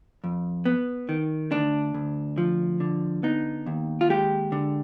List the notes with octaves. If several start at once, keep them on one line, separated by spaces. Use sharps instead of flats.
F2
B3
D#3
D2 D4
D2
F3
D3
B3 D#4
D#2
F4
G#3 G4
D3